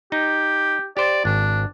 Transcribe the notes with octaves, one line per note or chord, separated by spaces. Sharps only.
D#4 G4
G4 C5 D5
G#1 D4